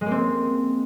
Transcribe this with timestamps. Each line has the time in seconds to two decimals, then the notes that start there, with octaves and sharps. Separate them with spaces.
0.01 G#3
0.06 A#3
0.11 C4